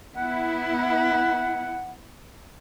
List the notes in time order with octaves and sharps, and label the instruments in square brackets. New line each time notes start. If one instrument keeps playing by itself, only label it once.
[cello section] B3 E4 [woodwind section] F#5